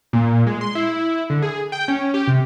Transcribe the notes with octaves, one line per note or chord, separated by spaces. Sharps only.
A#2
G#3
C6
E4
D3
G#4
G5
C#4
G4
C3